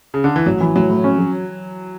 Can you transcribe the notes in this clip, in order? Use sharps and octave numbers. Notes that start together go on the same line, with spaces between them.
C#3
D3
E3
A1 F#3
E3
A2 F#3
A2
C#4
F#3